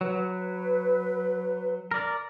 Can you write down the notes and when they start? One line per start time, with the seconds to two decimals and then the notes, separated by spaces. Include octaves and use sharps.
0.01 F#3 B4
1.91 A#4 D5